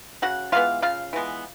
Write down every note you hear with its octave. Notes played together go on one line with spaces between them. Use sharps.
C#3 F#4 F#5
E3 G#3 B3 F4 F5
C#3 F4 F5
E3 G#3 B3